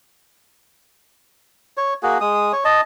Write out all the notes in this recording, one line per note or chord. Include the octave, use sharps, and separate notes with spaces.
C#5
A#3 F#4 G#4
G#3 D#6
C#5
D#5 A5